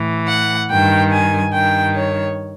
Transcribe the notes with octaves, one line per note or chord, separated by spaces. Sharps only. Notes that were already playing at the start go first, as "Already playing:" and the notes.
Already playing: A2 E3
F#5
G2 D#3 G5
G#5
G2 D#3 G5
C#5